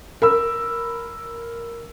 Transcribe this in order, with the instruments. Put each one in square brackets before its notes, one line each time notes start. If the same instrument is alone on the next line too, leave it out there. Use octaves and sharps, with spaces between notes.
[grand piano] A#4 B5 E6